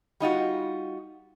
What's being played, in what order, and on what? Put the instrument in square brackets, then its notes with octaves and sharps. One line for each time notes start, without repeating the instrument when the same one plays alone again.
[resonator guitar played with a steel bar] G3 D#4 F4 F#4